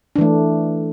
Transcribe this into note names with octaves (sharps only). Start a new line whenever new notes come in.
E3 A3 D4